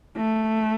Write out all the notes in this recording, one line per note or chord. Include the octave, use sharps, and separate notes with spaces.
A3